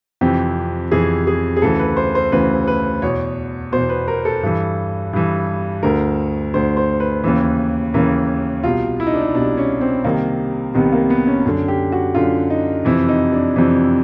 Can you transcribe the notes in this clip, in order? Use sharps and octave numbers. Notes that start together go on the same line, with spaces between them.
F2 C3 E3 G4
F2 C3 E3 G#4
G#4
G#4
D2 C#3 E3 A4
B4
C5
C5
D2 C#3 E3 B4
B4
E2 B2 C#5
E2 B2 C5
B4
A#4
A4
G2 E3
G2 E3
D2 D3 A#4
D2 D3 C5
C5
B4
D#2 C#3 E3
D#2 C#3 E3 A#4
C2 B2 F4
E4
D#4
D4
D#4
C2 B2 D4
C#4
C4
C2 C3 D#3 A#3
C2 C3 D#3 B3
A#3
B3
C#4
F#2 D3
G4
F#4
F#2 D3 F4
D#4
F2 C3 E3 E4
D#4
D4
F2 C3 E3